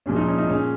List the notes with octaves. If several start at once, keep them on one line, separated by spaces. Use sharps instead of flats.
A#2 F3 G#3 C#4
D#4
C#4
D#4
A#2 G#3 C#4